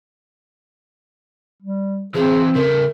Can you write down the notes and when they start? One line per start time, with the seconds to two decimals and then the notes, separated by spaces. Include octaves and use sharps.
1.62 G3
2.14 E3 C4 F4 G#4 C5
2.55 C#3 A3 A#4